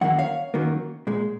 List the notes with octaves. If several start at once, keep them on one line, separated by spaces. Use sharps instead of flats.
F#2 D#3 F#3 A#3 F#5
C#5 F5
F#2 D#3 F#3 A#3
A#2 G#3